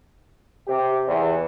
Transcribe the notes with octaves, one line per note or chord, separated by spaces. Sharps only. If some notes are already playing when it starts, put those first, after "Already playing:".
C3 G4
E2